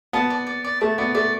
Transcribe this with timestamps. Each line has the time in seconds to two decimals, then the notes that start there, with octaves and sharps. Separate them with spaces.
0.13 B3 A5
0.30 D5
0.47 D5
0.64 D5
0.81 A3 A5
0.98 B3 D5
1.15 A3 D5